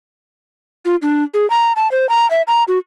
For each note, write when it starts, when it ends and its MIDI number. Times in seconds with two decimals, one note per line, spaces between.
0.85 0.96 65
1.02 1.24 62
1.34 1.48 68
1.50 1.73 82
1.76 1.90 81
1.92 2.09 72
2.09 2.29 82
2.31 2.42 76
2.48 2.64 82
2.68 2.78 66